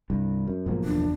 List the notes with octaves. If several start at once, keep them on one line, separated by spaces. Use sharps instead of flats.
C2 G2
F#2
B1 G#2 F3 G3 G#3 A#3
F#1 E2 D4